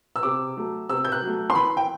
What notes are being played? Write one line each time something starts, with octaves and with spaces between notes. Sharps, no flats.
E6
C3 D6
F#3 A3
C3 E6
G6
F#6
F#3 A3
C6
E3 B5
G5